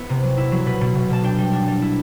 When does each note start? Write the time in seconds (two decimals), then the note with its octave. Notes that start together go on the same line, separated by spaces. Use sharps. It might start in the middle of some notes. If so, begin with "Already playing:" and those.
Already playing: B3 E4
0.09 C3
0.23 F#3
0.37 E4
0.52 F#3
0.66 B2 B4
0.81 B2
0.95 B2
1.10 B2 A5
1.23 D4 G5
1.38 G3
1.53 D4
1.68 G3
1.82 E4